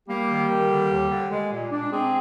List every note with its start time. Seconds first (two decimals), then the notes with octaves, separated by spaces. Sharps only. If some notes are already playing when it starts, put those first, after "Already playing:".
0.08 G3 A#3 G4
0.28 D#3
0.49 D#3
0.69 D3
0.89 D#2
1.09 D3
1.30 G#3
1.50 A#2
1.71 D4
1.91 G#3 C4 G#4